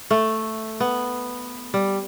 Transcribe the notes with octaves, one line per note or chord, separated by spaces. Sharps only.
A3
B3
G3